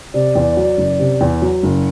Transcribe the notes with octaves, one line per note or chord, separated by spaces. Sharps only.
C3 D5
E2
F#3
F#1
C3
E2
F#3
F#1